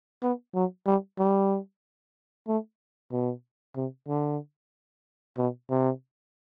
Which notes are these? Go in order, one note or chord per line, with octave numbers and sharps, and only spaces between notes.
B3
F#3
G3
G3
A3
B2
C3
D3
B2
C3